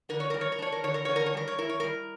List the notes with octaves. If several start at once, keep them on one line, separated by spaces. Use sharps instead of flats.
D3 A#4
C#5
G3 A#4
C#5
A#4
D4 C#5
A#4
D3 C#5
A#4
D3 C#5
A#4
C#5
G3 A#4
C#5
E4 A#4
C#5
G3 A#4